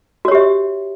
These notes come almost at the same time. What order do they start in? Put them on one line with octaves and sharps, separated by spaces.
F#4 C#5 G4 E5